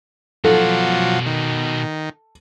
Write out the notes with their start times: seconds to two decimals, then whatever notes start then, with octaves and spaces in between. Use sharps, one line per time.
0.44 B2 F3 F#3 A4 D5
1.26 D#3